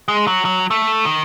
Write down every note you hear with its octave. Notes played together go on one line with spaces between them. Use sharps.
G#3
F#3
F#3
A3
D#3